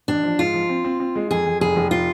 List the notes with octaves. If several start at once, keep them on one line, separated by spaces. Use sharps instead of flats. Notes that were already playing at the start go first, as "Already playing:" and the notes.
A1 D4
F3
G#2 F4
F3
C4
C4
C4
G#3
F2 G#4
F2
F1 G#4
F1
F4